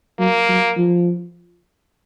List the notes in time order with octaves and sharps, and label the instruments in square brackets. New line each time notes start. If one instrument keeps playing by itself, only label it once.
[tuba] F#3 [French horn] A#3
[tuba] F#3
F3